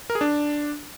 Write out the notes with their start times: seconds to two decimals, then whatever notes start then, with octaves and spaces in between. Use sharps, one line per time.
0.10 A#4
0.15 G#4
0.21 D4